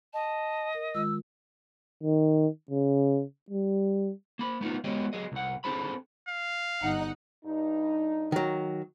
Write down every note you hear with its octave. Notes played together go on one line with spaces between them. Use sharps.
D#5 A5
A#4
D#3 G#3 F4 E6
D#3
C#3
G3
A#3 B5
A3 B3 D#4 F4
G#3 B3 F#4 G4 C#5 D#5
F#3 G#4 D#5
C2 F#5
C4 D4 G#4 A4 C5 B5
F5
G1 D#4 F#5
G2 D#4
D#3 F#3